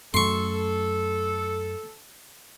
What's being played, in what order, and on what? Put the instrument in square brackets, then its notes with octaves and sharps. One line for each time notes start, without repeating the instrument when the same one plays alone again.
[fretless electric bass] F#2 A3 [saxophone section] A4 [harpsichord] C6 C#6